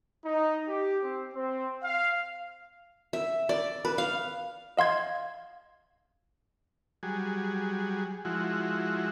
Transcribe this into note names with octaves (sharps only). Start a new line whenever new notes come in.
D#4
G4
C4
C4
F5
E5
D5
B4
F5
D#5 F5 C6 G#6
F#3 G3 G#4
F3 G#3 E4 F#4